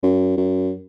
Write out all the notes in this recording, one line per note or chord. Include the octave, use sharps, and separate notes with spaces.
F#2
F#2